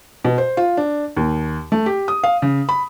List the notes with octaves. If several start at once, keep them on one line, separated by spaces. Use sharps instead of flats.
B2
C5
F4
D4
D#2
A3
G4
D#6
F5
C#3
B5